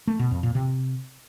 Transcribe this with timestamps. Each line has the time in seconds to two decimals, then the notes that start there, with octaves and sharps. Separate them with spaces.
0.07 A3
0.19 B2
0.31 F2
0.43 A#2
0.55 C3